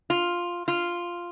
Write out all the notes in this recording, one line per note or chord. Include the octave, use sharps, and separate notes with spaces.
F4
F4